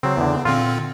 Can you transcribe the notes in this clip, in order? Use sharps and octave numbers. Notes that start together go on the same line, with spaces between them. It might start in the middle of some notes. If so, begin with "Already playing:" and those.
C#3 F#3 C4
E2 D3
A#2 D3 C4 F4